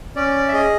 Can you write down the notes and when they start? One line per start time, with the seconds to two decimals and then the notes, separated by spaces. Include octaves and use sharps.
0.16 C#4 D5
0.48 E5
0.53 G#4 D#5